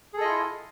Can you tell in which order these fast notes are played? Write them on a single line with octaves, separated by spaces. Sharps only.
G#4 A4 D#5 F4 E4